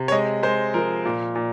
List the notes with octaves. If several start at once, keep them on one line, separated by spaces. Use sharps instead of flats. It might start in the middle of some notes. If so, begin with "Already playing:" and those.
Already playing: C3
C#5
G#3 D#5
G#3 C5
F3 A#4
A#2
A#2